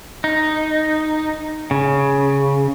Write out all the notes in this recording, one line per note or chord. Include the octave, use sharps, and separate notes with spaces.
D#4
C#3